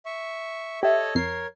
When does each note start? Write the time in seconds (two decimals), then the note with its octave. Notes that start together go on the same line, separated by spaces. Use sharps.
0.06 E5 C#6
0.83 G4 A4 C#5 D#5 E5
1.15 F2 A#4 C#5 C7